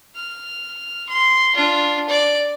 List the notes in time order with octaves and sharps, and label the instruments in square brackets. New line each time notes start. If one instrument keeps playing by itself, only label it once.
[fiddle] F6
C6
D4 F4
D5